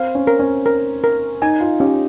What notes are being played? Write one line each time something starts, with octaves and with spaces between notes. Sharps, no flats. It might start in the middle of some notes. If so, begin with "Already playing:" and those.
Already playing: C4 F5
C#4
A#4
C#4
A#4
A#4
D#4 G#5
F4
C#4 G4